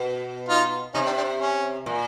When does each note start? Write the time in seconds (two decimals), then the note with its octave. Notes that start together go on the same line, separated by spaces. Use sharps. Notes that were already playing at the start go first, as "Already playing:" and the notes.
Already playing: B2
0.49 D#4 F4
0.94 C3 C#4 D#4
1.06 C4 D4
1.17 C4 D4
1.40 C#4
1.86 A#2